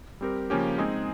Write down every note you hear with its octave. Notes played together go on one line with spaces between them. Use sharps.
G3 C4 G4 A#4
C#3 F3 A#3 C#4 G4
G#3 C4 D#4 G#4